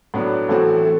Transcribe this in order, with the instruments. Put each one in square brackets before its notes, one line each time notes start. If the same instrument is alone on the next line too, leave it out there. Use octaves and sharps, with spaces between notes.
[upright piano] A2 F#3 B3 D4
A2 E3 A3 C4 F#4
A3